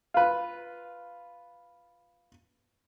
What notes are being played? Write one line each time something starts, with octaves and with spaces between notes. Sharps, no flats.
F4 B4